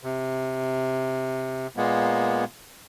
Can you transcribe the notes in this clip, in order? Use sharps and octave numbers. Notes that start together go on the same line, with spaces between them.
C3
A#2 G#3 A#3 B3